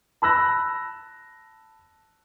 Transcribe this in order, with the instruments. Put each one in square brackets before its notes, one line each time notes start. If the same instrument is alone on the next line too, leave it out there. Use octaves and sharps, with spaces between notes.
[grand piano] A5 B5 E6 F#6 A#6